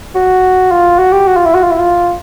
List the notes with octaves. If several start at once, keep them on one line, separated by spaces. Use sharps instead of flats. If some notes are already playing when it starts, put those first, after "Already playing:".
F#4
F4
F#4
G4
F#4
F4
E4
F#4
F4
E4
F4